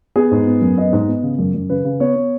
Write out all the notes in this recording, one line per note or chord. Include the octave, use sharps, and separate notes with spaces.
B3 G#4
G#2
B3
F#2
B3 D#5
G#2
B3
C#3
F#2
F#2
C#3 B4
C#3
B3 C#5
B3